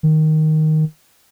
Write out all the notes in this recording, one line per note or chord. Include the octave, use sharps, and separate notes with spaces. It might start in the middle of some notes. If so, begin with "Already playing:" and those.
D#3